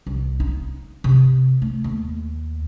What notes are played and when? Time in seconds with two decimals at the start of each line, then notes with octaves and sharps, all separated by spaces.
0.07 C2
0.40 D#4
1.04 C3
1.62 A3
1.84 D#2